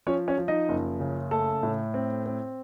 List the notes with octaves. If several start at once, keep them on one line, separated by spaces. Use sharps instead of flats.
F3 C#4 C#5
C#4 C#5
F3
D#4 D#5
F#1
C#3
A3 A4 A5
A2
C4
C4